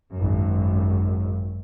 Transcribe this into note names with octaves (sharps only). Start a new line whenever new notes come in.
G#1 F#2